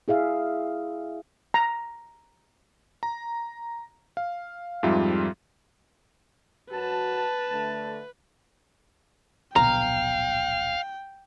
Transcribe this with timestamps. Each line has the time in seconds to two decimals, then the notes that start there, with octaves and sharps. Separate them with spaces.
0.08 E4 G#4 E5 F5
1.54 A#5
3.03 A#5
4.17 F5
4.83 F2 G#2 G3 F4 E5
6.71 F#2 F#4 B4 A5
7.50 D3 A3
9.56 D1 A#1 B2 F5 G5 A#5